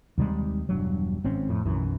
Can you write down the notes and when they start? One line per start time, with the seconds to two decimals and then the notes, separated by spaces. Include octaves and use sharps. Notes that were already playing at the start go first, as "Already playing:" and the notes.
0.18 D#2 C3 G3 G#3
0.69 E1 G2 F#3
1.24 G#1 C4 C#4
1.49 F2 A2
1.65 B1 F#2 E3